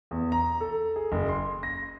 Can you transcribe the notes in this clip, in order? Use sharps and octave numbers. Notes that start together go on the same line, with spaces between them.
E2
A#5
A4
G#4
F#1
C6
A#6